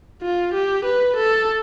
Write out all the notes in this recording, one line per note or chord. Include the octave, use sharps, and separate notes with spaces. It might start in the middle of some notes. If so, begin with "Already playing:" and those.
F4
G4
B4
A4